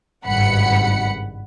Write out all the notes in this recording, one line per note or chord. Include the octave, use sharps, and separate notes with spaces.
G#1 C#2 G2 F#5 B5 C#7